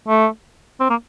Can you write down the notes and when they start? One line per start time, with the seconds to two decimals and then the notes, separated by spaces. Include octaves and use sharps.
0.08 A3
0.80 C4
0.90 A#3